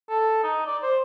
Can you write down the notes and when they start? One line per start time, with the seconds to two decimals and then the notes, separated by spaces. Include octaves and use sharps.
0.09 A4
0.43 D#4
0.66 D5
0.83 C5